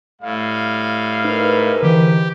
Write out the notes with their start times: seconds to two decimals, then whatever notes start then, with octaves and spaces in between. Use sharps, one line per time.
0.22 A2 G3 F5
1.25 G#2 D#4 A#4 B4
1.83 D3 E3 G4